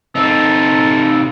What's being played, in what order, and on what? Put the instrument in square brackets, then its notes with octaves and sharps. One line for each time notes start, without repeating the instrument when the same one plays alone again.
[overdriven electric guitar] C3 D#4 [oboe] A4